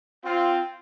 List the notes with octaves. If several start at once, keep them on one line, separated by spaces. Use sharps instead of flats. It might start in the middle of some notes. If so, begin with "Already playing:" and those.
C4 F4